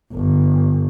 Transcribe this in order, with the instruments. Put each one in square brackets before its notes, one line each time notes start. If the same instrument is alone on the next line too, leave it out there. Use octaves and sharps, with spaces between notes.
[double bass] G1